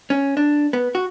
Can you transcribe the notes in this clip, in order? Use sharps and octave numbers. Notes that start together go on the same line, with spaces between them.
C#4
D4
B3
F#4